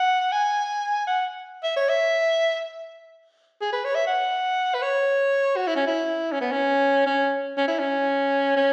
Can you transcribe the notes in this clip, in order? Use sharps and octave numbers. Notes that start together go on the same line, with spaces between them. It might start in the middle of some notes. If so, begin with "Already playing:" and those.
Already playing: F#5
G#5
F#5
E5
C#5
E5
G#4
B4
C#5
E5
F#5
B4
C#5
F#4
E4
C#4
E4
C#4
B3
C#4
C#4
C#4
E4
C#4
C#4